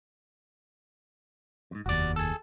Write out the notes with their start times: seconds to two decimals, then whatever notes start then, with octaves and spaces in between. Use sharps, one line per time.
1.71 F2 G#2
1.86 F1 D#2 F#4 D5
2.16 G#4 A4